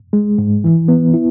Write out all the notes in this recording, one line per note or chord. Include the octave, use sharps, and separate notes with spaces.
G#3
G#2
E3
B3
E4